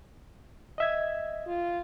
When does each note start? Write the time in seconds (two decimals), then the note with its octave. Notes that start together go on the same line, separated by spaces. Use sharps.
0.78 D#5 E5 G#6
1.47 F4